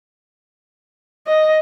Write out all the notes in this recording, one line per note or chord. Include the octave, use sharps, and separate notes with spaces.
D#5